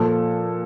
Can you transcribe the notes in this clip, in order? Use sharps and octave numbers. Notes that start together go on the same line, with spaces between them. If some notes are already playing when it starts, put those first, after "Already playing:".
Already playing: A#2 F3 A4